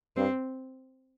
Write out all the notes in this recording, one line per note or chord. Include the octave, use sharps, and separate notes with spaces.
G2 C4